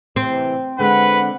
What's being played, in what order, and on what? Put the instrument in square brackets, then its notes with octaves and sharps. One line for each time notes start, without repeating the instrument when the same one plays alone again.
[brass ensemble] C3 E3 [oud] C4
[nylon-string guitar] D3 G#3 [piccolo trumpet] B4 [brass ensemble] F#5